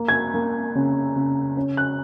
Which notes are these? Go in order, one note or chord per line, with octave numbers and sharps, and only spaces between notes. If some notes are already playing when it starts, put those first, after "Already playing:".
Already playing: A#3
G#6
A#3
C#3
C#3
C#4
F#6